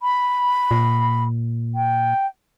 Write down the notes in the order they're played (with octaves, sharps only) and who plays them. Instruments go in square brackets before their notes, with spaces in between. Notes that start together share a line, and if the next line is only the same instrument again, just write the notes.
[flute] B5
[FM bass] A#2
[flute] G5